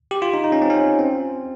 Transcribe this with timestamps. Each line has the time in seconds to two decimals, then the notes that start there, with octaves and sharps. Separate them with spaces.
0.11 G4
0.22 F4
0.34 D#4
0.44 D#4
0.52 C#4
0.62 C4
0.70 C#4
0.99 C4